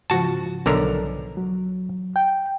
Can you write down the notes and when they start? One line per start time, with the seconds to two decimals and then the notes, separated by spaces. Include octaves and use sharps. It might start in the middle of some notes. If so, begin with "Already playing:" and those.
0.10 G#2 C#3 F3 F#4 A5
0.66 B1 D3 A#4
1.37 F#3
2.16 G5